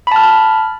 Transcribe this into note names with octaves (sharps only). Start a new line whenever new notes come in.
A5 B5 F6